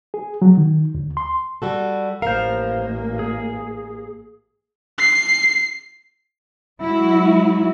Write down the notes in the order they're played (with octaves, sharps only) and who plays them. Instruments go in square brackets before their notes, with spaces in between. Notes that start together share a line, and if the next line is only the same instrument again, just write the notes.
[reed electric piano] G#4
F#3
D#3
D2
C6
[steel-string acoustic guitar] G3 F#4 A4
[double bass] A1 A#3 [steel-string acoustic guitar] A#4 [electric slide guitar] C5 F5
[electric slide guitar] G#4
[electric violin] C7
[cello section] F#3 G#3 E4 F#4